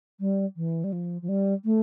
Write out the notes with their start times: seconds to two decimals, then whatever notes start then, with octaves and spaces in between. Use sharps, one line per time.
0.20 G3
0.56 E3
0.84 G3
0.92 F3
1.22 F3
1.28 G3
1.65 A3